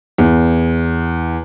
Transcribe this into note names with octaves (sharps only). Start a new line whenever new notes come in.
E2